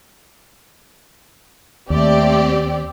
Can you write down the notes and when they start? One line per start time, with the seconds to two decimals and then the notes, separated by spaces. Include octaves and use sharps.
1.90 D#2 A3 C4 G4 D5